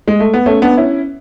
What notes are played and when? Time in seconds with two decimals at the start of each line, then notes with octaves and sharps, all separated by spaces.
0.08 G#3
0.20 A3
0.34 B3
0.46 A3 C#4
0.62 B3 D4
0.77 C#4 E4